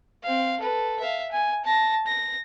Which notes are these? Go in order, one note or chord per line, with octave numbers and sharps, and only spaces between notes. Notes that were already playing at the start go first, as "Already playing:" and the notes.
C4 F5
A4 B4
E5 F5
G#5
A5 A#6
A#6